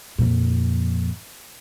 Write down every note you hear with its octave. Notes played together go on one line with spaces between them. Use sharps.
F2 A#2